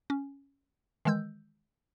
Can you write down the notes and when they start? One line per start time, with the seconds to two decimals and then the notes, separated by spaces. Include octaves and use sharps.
0.10 C#4
1.05 D#3 E3 G#3 E6 G6